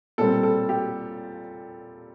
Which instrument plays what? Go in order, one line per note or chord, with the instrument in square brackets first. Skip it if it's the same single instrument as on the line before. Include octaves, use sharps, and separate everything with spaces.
[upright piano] A#2 G3 C4 A4
A4
G4